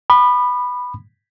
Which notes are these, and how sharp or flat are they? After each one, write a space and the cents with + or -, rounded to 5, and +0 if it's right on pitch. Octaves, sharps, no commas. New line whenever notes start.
B5 +0 D#6 -45